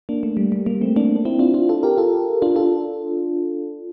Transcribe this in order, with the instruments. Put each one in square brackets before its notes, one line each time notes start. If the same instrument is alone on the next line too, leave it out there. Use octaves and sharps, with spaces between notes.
[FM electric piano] A#3 D4
A3
G3
G3
G3 A#3
A3 C4
A#3 D4
D4
C4 E4
D4 F4
D4 F4
F4 A4
G4 A#4
F4 A4
D4 F4
F4 A4